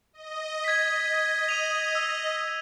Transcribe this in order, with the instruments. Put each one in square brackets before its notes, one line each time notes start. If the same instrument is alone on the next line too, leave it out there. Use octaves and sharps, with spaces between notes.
[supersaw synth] D#5
[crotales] G#6 B6
D#6 D#7 F7
E6